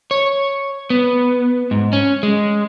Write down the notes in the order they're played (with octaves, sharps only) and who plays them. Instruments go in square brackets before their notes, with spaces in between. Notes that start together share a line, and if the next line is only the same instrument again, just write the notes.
[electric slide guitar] C#5
B3
G#2
C#4
G#3